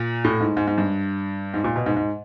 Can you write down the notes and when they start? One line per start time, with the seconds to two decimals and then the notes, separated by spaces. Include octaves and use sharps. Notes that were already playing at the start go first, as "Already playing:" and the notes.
Already playing: A#2
0.24 A2
0.41 G#2
0.57 G#2
0.67 G#2
0.78 G2
1.54 G#2
1.64 A#2
1.76 B2
1.86 G#2
1.97 G#2